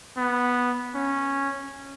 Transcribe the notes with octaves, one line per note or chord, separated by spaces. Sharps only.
B3
C#4